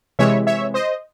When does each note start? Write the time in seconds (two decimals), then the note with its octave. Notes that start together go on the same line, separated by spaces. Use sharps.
0.19 C3 E3 G#3 C#5 E5
0.47 C#5 E5
0.74 C5 D#5